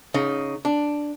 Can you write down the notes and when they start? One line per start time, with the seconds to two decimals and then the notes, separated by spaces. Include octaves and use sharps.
0.14 C#3 D#4
0.65 D4